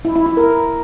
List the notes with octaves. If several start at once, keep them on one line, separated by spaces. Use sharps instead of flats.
E4
E4
E4
A#4